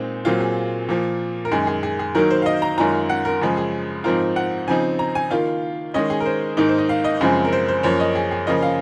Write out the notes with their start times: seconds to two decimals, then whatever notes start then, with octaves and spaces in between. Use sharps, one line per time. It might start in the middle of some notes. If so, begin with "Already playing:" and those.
Already playing: A#2 G#3 C4 D#4
0.25 A#2 F#3 C4 F4
0.40 G#4
0.89 A#2 F3 A#3
1.45 A#4
1.51 F#2 D#3 G#3 G#4
1.67 G#4
1.83 G#4
1.99 G#4
2.15 D#3 F#3 A#3 D#4 A#4
2.30 C5
2.42 F5
2.46 D#5
2.62 A#5
2.78 F#2 D#3 G#3 C#4 F4 A#5
3.09 F#5
3.25 A#4
3.41 F#2 C#3 F3 G#3
3.57 G#4
4.04 G#2 F3 C4 F4 A#4
4.36 F#5
4.67 C#3 F3 C4 D#4 G#5
4.99 A#5
5.15 G#5
5.31 D#3 A#3 F4 F5
5.94 D#3 G#3 C#4 D#5
6.10 G#4
6.20 A#4
6.26 C5
6.57 G#2 D#3 A#3 D#4 A#4
6.69 C5
6.78 D#5
6.89 F5
7.04 D#5
7.21 F#2 C#3 F3 G#3 C4 G#4
7.45 A#4
7.53 C5
7.68 C5
7.83 F#2 F3 A#3 C#5
8.00 D#5
8.15 G#4
8.31 G#4
8.47 C#3 F3 A#3 C#4 F4 D#5
8.63 F5